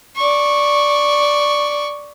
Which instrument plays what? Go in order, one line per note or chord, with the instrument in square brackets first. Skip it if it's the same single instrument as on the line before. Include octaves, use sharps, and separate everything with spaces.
[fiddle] D5 C#6